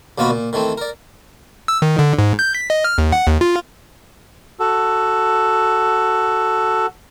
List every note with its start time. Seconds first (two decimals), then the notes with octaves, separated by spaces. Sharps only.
0.18 D#2 B2 A#3 F4 F#4 B5
0.30 A#2
0.53 D#3 E3 A3 C4
0.78 A#4 D5
1.68 E6
1.82 D#3
1.99 D3
2.19 G#2
2.39 G6
2.55 B6
2.70 D#5
2.84 F6
2.98 D#2
3.12 F#5
3.26 D#2
3.41 F4
4.60 F#4 A4